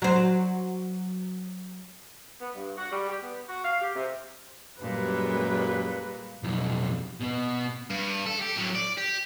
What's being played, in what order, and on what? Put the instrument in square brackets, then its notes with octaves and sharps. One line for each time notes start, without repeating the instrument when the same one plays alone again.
[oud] F#3 C5
[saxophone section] B3
G2
F#4
G3
G4
B3
F#4
F5
G4
C3
[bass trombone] F#2 [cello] A#2 [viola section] G3 G#3 [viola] B4
[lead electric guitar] B1 F2
B2 B3
[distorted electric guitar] G2
A4
G4
A2 F#3
D5
G4